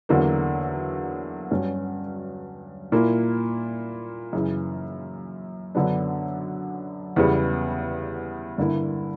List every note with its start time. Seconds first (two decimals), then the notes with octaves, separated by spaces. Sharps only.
0.09 E2 D3 F#3 A#3
1.51 G2 F#3 C#4
2.92 A#2 A#3 E4
4.33 F#2 C#3 E3
5.75 F#2 D3 F#3 B3 D4
7.16 E2 C#3 G3 B3
8.58 G2 D3 A#3 E4